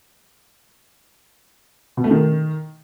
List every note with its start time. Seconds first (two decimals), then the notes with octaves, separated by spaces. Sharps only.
1.97 B2
2.04 A3
2.11 D#3